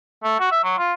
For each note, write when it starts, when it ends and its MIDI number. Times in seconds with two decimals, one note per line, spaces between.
0.24 0.39 57
0.40 0.51 66
0.51 0.61 76
0.64 0.75 54
0.78 0.94 65